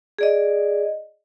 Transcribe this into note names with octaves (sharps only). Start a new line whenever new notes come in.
G#4 D5 D#5